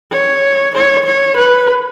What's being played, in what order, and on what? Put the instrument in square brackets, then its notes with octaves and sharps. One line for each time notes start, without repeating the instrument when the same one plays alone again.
[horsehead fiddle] C#5
C#5
C#5
B4